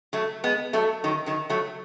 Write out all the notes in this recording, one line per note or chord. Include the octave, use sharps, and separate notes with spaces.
F#3 A3
G#3 B3
F#3 A3
D#3 F#3
D#3 F#3
F#3 A3